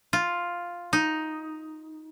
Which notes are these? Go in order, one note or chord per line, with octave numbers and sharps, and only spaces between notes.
F4
D#4